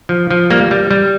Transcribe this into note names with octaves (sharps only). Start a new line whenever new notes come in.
F3
F3
G3 A#3
G3
G3